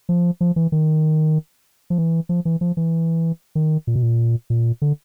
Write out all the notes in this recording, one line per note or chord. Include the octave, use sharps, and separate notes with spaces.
F3
F3
E3
D#3
F3
E3
F3
E3
F3
E3
D#3
A#2
B2
A#2
A#2
D3